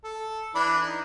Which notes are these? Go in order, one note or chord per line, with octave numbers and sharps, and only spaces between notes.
A4
E3 D4 B5
D#4